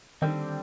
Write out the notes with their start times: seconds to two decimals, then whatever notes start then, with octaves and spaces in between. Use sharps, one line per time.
0.22 D3 D#3 G3 C4